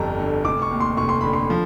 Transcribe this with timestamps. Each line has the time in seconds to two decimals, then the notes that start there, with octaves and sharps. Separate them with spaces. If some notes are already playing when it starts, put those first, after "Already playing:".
Already playing: G1 F2 G3 A5 A#5
0.19 D3
0.45 F1 D6
0.62 C#6
0.71 D#2
0.80 C6
0.97 F1 C#6
1.09 C6
1.21 D3 B5
1.33 C6
1.50 F3